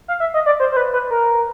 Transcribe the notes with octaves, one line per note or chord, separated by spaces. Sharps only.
F5
E5
D#5
D5
C5
C5
B4
B4
A#4